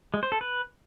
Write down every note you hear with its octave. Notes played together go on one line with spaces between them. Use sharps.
G#3
C5
A4
B4